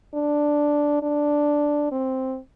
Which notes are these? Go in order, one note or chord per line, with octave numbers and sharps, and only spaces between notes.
D4
D4
C4